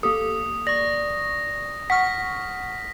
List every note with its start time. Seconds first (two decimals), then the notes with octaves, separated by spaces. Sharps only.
0.03 A#3 G4 A4 D#6
0.67 D5 C#6 A#6
1.90 F#5 C#6 F6 B6